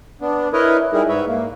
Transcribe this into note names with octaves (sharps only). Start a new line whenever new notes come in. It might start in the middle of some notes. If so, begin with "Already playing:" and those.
B3 D4
E4 A#4 B4 C#5 D#5
G3 D#4 E4 G#4 A#4
G#2 B4 C#5 E5
A#3